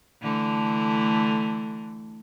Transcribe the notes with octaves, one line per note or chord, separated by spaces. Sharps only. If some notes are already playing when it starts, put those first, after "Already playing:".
D3 E3 A3